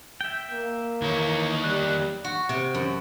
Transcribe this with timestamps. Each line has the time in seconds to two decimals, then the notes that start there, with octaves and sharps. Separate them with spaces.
0.21 E5 G5
0.51 A#3
1.02 D#2 D#3 E3 E4 C#5
1.64 G3 F#6
2.24 F#4
2.49 C3
2.74 F#2